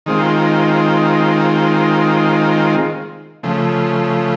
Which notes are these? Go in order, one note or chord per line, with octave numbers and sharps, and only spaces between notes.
D#3 G#3 C4 F4
C#3 F3 A3